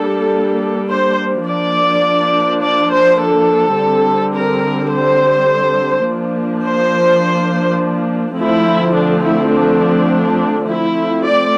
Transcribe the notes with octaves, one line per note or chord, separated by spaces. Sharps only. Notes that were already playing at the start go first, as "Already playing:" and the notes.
Already playing: G3 A#3 D4 A4
C5
F3 A#3 D4 D5
D5
C5
A4
D3 G3 C4
A#4
C5
F3 A#3 D4
C5
D3 F3 A3 C4 E4
D4
E4
D4
F3 A3 C4 E4
D5